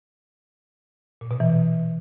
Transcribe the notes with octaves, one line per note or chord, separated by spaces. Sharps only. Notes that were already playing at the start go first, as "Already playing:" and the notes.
A#2
B2
E3